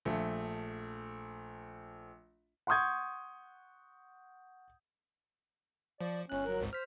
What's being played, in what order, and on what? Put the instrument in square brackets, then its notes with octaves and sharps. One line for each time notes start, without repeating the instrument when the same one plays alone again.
[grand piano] A#1 A3
F#5 C6 C#6 D#6 G6 G#6
[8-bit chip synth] F3 [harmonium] D5
[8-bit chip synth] G1 F#6 [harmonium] C#4
[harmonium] F#3 A#4
[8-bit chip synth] G#1 C#2 G#2
[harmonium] C5 [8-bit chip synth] F6 B6